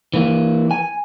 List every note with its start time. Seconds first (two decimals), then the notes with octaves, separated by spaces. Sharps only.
0.14 E3 A#3
0.71 G#5